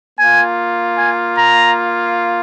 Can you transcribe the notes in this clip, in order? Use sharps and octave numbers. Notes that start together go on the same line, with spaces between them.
A#3 F4 G#5
G#5
A#5